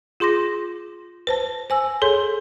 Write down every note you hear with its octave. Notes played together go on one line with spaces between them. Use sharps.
F4 G#4 C6 D6 A#6
B4 C5 A5
C5 G#5 E6
G#4 A4 C#5 C6